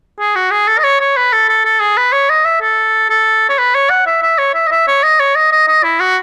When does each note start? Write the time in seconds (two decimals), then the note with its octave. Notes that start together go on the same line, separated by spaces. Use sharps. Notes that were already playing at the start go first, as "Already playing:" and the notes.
0.19 G#4
0.35 F#4
0.51 G#4
0.68 A4
0.78 D#5
0.84 C#5
1.01 C#5
1.17 B4
1.32 A4
1.49 A4
1.65 A4
1.80 G#4
1.97 B4
2.13 C#5
2.29 D#5
2.45 E5
2.61 A4
3.10 A4
3.49 C#5
3.58 B4
3.75 C#5
3.90 F#5
4.07 E5
4.22 E5
4.38 C#5
4.54 E5
4.67 D#5
4.71 E5
4.88 C#5
5.03 D#5
5.20 C#5
5.35 D#5
5.52 D#5
5.68 D#5
5.83 E4
6.00 F#4